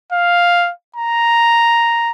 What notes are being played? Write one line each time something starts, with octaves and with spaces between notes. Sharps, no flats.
F5
A#5